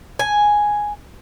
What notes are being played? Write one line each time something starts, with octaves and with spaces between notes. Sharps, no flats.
G#5